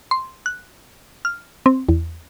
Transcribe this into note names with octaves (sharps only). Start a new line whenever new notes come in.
C6
F#6
F6
C4
E2